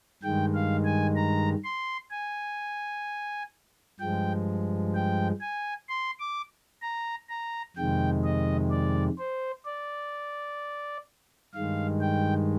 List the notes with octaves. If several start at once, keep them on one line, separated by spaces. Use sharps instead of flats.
G2 D#3 G#3 G5
F5
G#5
A#5
C6
G#5
G2 F3 G#3 G5
G5
G#5
C6
D6
A#5
A#5
F2 C3 D#3 G#3 G5
D#5
D5
C5
D5
G2 D#3 G#3 F5
G5